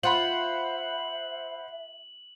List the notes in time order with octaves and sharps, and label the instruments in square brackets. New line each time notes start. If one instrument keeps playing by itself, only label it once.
[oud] F4 [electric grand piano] C5 F#5 B5 [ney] E5 [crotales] F#7